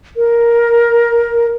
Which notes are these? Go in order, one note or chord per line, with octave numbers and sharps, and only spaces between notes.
A#4